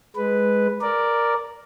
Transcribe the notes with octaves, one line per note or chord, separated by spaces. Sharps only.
G#3 B4
A#4 D5